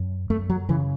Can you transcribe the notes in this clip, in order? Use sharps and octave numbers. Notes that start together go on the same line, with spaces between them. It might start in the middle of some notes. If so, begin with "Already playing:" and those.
Already playing: F#2
F#2 A3
F#3
C#3 E3